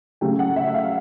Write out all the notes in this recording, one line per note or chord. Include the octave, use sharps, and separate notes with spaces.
C#3 F#3 A3 G5
F#5
E5
F5